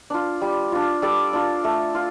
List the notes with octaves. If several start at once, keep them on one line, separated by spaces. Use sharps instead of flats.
D4 F4
G3
D4 F4
G3 A4 D5
D4 F4
A3
F4